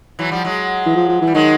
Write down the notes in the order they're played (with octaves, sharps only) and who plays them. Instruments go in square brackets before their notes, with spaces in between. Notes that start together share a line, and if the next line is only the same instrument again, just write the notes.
[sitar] E3 F#3
F3 G3
F#3 G#3
[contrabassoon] E3
F3
F3
E3
[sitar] G3
[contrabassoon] D#3 [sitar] F#3 G#3